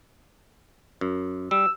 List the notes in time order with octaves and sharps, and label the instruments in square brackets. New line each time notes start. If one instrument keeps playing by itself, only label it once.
[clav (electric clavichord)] F#2
[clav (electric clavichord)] G3 [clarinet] E6